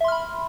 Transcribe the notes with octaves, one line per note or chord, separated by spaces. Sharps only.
E5 B5 C6 F6